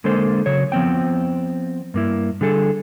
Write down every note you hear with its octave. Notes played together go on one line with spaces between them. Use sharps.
D3 G#3 A#3 A4 C5
C#3 F#3 C#5
F3 B3 C4 G5
G2 A#3 E4
D3 G3 G#4 A4